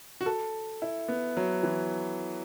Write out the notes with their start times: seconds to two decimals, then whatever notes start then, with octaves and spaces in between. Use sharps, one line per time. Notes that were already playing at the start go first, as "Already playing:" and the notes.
0.21 F#4
0.26 A4
0.82 E4
1.08 B3
1.37 F#3
1.63 E3